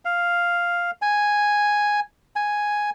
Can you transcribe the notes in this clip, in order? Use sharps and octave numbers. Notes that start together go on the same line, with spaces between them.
F5
G#5
G#5